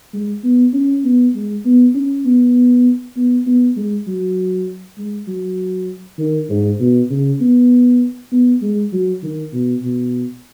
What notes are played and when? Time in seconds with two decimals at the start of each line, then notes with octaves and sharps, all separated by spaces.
0.13 G#3
0.43 B3
0.73 C#4
1.05 B3
1.34 G#3
1.65 B3
1.94 C#4
2.25 B3
3.16 B3
3.46 B3
3.77 G#3
4.07 F#3
4.98 G#3
5.28 F#3
6.19 D#3
6.49 G#2
6.80 B2
7.10 C#3
7.40 B3
8.32 B3
8.62 G#3
8.92 F#3
9.23 D#3
9.53 B2
9.82 B2